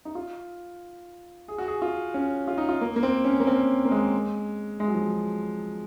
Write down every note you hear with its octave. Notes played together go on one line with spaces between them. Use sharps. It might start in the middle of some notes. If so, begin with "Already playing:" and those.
D#4
F4
G#4
F#4
G#4
F4
C#4
F4
D#4
F4
A#3
A#3
C4
C#4
A#3
C4
A#3
G#3
G#3
F#3
F3
F#3